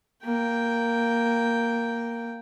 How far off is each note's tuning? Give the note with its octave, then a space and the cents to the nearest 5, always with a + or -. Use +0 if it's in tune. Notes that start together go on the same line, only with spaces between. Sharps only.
A#3 +0 G5 +0